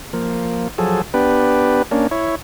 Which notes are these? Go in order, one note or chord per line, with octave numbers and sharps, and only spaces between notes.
F3 A#3
F3 F#3 G#4 A4
B3 D4 G4 B4
A#3 C#4 D4
E4 C#5